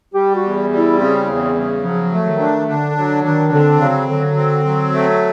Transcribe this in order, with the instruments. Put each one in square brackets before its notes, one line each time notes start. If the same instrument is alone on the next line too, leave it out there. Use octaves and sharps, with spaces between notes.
[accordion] G3 [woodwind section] G4
[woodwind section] F#4
[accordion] E2
G3
[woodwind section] E4
[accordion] C#3 [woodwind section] C4
[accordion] E2 [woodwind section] C4
[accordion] C#3 [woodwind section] G3
[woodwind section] F3 [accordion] F#3
[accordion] A3
[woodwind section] D#3
[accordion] D4
[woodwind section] D3 [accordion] D4
[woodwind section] D3 [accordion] F#3
[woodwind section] D#3 [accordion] D4
[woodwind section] D3 [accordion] C4
[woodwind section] C#3 [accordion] F#3
[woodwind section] D3 [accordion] F#3
[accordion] C4
F#3
A3